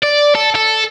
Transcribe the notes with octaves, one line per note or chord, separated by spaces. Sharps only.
D5
A4
A4